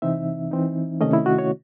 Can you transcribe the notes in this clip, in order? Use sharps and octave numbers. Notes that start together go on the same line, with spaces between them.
C3 E3 C4 D#4 E5
E3 C4 D#4
C3 D#3 A3 C#4 D#5
E4
F#4
C#5